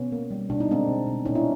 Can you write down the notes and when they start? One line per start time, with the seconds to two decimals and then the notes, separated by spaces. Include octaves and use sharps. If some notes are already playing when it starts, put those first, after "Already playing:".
Already playing: B2 B3 C#4
0.12 A#3
0.31 G3
0.50 B2 D4
0.60 D#4
0.69 G#3 C4 D4
0.88 B2
1.07 B2
1.25 A#2 C#4 D#4
1.35 D4 E4